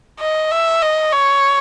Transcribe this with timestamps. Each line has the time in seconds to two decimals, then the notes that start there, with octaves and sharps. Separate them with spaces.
0.20 D#5
0.51 E5
0.82 D#5
1.13 C#5